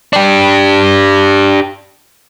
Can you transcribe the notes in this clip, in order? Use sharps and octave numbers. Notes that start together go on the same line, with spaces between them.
D4 G4